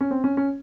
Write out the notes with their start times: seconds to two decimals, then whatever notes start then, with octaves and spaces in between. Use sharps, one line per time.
0.01 C#4
0.11 C4
0.24 C#4
0.37 C#4